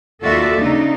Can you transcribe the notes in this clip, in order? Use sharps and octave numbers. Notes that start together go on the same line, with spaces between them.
D#2 F4 F#4 A4 D5 E5
C#3 D4 D#4